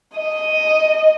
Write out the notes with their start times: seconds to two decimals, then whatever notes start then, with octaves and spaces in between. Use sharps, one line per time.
0.17 D#5